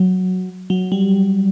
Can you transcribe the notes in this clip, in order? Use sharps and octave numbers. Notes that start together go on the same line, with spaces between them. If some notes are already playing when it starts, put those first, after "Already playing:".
Already playing: F#3
F#3
G3